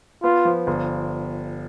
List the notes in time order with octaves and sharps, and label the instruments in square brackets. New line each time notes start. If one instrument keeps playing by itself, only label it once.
[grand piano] B3 [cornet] F4
[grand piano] F3
G1